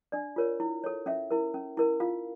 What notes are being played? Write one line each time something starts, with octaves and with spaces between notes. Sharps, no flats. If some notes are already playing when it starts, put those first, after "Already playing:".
D4 D5
F4 A#4 C#5
E4
A4 C#5
C#4 E5
E4 A#4
C#4
E4 A#4
F4 F5